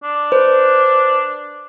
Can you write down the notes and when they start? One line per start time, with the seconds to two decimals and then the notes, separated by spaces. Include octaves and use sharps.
0.03 D4
0.32 B4 C5